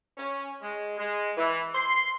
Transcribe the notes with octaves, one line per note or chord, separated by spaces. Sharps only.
C#4
G#3
G#3
E3
C6